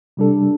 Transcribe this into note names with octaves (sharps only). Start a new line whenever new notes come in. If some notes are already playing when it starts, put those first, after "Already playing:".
C3 G3 D4 A4